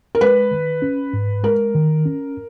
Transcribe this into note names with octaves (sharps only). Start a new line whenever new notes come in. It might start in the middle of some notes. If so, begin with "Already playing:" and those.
A#4
G#3 B4
D#3
C#4
G#2
G#3 A#4
D#3
C#4